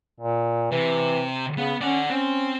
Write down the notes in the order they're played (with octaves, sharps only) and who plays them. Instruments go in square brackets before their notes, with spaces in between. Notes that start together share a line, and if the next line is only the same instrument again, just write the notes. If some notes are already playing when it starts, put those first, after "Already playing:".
[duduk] A#2
[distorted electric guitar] C3 [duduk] E3
[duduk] C#3 [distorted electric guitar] B3
[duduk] C#4 [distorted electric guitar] D5 F#5
[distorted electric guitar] C4 [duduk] C#4